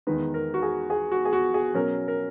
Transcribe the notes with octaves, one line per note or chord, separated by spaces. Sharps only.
E2 D#3 G#3 D#4 B4
A#4
F#4
G#4
G#4
F#4
G#4
F#4
G#4
B2 F#3 C#4 A#4
A#4